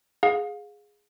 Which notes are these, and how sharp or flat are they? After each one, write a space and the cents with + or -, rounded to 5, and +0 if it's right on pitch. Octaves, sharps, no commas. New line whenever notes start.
G#4 +0 F5 +35